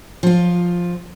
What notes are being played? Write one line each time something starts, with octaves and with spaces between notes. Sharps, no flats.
F3 F4